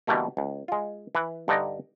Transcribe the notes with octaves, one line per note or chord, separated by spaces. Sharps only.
B2 D3 E3 G3 A3 A#3
C#2
G#3 F4
E3 B4
G2 D3 D#4 D5 D#5